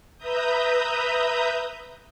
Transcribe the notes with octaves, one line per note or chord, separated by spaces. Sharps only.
B4 E5 A#5 D#6 G6